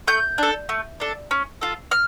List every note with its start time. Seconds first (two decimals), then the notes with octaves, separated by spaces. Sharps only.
0.08 A3 G6
0.38 D4 A4
0.69 A3
1.00 D4 A4
1.31 C#4
1.61 F4 A4
1.91 F6